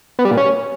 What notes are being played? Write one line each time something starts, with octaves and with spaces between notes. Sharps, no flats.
B3
G3
A#2
C#4